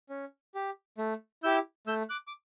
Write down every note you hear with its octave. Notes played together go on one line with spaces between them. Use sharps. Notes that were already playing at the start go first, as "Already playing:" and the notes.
C#4
G4
A3
E4 G4 E6 G6
A3 E6 G6
D6 F#6
D6